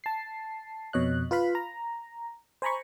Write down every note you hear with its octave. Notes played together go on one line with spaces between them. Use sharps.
A5 C7
F2 B2 C#5 D#5 F#6
F4 B4 F5 B5
A#5
C5 G#5 A#5 B5 C#6